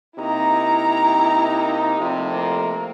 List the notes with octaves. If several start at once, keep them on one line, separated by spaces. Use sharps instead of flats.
C3 A#3 D#4 E4 A#5
F2 A2 C3
A#3